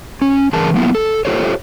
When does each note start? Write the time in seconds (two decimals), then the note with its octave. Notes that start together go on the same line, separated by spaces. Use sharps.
0.22 C#4
0.53 G2 C#3 E3 G#4 A#4 A5
0.74 F#3 A#3 B3 E4 F4
0.95 A4
1.25 F4 G4 A4 C5 C#5